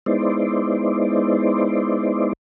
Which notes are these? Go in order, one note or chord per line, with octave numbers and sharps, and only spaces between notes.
G#3 B3 D#4 E4 C5 D5